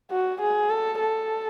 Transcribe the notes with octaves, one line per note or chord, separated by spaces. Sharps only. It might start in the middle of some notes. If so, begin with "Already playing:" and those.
F#4
G#4
A4
A4